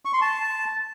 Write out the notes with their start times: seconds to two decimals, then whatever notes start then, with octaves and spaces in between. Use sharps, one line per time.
0.05 C#6
0.13 C6
0.21 A5